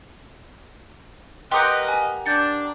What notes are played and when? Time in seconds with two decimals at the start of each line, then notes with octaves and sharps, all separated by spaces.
1.52 G4 A#4 B4 D#5 F#5 C6 D6 G6
1.88 G#5
2.26 D4 G6 A6 C#7